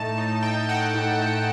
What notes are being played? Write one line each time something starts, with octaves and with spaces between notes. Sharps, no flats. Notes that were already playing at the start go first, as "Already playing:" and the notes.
Already playing: A2 A3 D#4 A5
D#4
D#4 G5
D#4 F#5
A2
A3